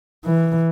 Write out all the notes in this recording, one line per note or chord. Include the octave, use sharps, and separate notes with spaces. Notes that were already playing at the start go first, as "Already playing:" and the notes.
E3